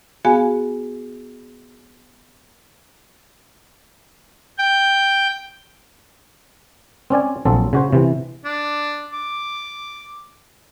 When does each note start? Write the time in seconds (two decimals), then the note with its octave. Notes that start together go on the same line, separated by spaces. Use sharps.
0.25 B3 F#4 G#4 F5 G#5
4.58 G5
7.10 C4 C#4 D5 G#5
7.45 A#1 F#3 C4 A4
7.73 C#3 F#4 C5
7.93 C3 E3
8.45 D4
9.13 D6